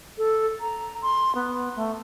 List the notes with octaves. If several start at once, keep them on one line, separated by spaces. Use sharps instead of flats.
A4
A#5
C6
B3
A3